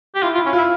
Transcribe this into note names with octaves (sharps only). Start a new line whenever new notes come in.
G4
E4 F4
F4
E4
C#4
E4 F4